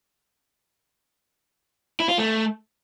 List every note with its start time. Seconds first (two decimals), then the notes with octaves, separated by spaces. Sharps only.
2.00 E4
2.09 F4
2.18 A3